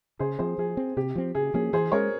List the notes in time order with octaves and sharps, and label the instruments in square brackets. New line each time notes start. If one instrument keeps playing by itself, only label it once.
[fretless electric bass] C#3 [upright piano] G#4 C5
[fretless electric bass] F3 C4 [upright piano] G#4 C5
[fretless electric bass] F3 [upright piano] G#4
[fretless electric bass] C4
[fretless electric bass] C3 [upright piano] G4
[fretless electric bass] F3 C4
[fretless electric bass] C#3 [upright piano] G#4
[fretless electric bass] F3 A#3 C#4 [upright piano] G#4
[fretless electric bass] E3 [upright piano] G#4 C5
[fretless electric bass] G#3 C#4 [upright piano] A#4 C#5